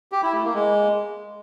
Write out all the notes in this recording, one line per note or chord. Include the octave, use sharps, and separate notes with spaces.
G4
E4
A3
A#3
G#3